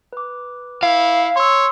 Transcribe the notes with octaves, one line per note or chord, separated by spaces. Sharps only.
B4 D6
E4 F5
C#5 C6 E6